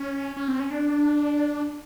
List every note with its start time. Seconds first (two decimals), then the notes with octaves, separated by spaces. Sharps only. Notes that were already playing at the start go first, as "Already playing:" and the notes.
Already playing: C#4
0.37 C#4
0.48 C4
0.60 C#4
0.71 D4